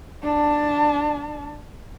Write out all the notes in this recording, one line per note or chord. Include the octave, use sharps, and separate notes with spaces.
D4 A5